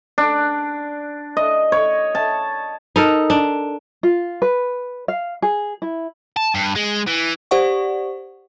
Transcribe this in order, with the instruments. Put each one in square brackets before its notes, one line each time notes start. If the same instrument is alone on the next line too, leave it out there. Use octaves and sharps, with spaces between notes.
[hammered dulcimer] D4
D#5
C#5
A5
[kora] D#4 A4 A#4
D4
[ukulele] F4
B4
F5
G#4
E4
[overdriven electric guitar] A5
G2
G#3
E3
[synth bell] G4 C5 D5 F#5 C#6